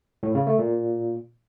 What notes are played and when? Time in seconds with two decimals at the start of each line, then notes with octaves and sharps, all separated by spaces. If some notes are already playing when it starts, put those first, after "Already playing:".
0.23 A2
0.35 C#3
0.47 A3
0.59 A#2